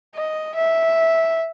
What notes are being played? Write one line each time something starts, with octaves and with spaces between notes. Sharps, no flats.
D#5
E5